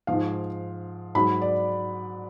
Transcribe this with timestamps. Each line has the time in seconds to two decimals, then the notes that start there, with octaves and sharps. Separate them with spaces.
0.07 G#2 F3 F5
1.15 G#2 F#3 B5
1.42 D5